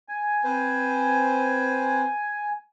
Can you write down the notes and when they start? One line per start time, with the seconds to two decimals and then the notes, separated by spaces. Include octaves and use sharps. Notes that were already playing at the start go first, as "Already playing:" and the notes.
0.09 G#5
0.44 C4 B4 C5